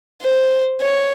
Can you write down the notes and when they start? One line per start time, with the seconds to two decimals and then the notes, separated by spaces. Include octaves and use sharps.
0.21 C5
0.81 C#5